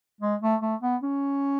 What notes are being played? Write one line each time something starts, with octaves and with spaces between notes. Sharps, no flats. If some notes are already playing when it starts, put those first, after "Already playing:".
G#3
A3
A3
B3
C#4